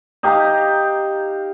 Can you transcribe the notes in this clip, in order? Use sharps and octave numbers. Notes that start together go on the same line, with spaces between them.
D#4 G4 F5 A#5